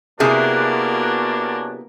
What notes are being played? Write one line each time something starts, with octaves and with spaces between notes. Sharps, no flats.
F#2 C3 A#3 B3 D4 E4 F#4 G#4